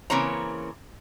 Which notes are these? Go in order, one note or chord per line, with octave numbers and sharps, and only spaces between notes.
C#3 E3 A#3 C4 C#5 A#5